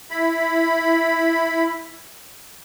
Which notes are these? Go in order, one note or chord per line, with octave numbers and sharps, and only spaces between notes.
E4 B5